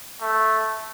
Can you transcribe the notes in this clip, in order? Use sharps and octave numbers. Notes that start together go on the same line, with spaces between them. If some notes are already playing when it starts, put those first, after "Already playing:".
A3